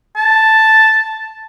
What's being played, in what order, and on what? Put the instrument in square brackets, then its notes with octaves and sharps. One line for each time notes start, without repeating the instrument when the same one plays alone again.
[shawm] A5